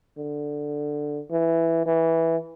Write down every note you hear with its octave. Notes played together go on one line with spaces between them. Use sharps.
D3
E3
E3